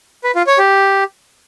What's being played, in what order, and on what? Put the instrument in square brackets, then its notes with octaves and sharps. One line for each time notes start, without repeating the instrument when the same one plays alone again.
[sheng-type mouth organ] B4
F4
C#5
G4